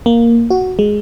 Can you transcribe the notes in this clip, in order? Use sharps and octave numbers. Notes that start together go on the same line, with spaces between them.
A#3
F#4
G#3